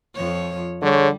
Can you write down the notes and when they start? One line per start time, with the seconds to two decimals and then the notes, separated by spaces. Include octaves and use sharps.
0.15 F2 F3 C#5
0.82 D3 G3 G#4 C#5